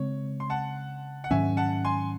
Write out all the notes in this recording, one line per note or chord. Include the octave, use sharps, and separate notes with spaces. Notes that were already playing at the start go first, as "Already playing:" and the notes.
Already playing: C#3 G#3 C4 C#5
C6
F#5 A5
F#5
G#2 D#3 F#3 C#4 E5 G#5
F#5 A5
G#5 C6